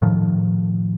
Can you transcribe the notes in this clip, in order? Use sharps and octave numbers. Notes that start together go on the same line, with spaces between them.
A2 D#3 F3